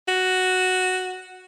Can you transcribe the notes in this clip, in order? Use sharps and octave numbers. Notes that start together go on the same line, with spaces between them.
F#4